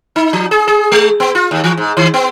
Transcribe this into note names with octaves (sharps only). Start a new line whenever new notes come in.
D#4
F3
G#4
G#4
G#3
B3
F4
D#2
E3
G#2
D#3
B3